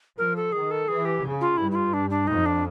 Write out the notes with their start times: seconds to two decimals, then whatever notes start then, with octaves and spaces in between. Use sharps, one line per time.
0.18 F3 A#4
0.36 A4
0.52 D#3 G#4
0.71 A4
0.88 E3 G#4
1.05 G4
1.23 C#3
1.41 F4
1.57 G2 E4
1.71 E4
1.75 F4
1.93 D4
2.10 D4
2.27 F2 D#4
2.46 D4